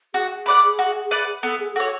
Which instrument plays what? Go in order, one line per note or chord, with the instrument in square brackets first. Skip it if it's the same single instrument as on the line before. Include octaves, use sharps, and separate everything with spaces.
[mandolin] F#4 [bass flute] G#4
[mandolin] B4 D5 F#5
F#4
B4 D5 F#5
[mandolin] B3 [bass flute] A4
[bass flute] G#4
[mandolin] F#4 C#5 [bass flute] A4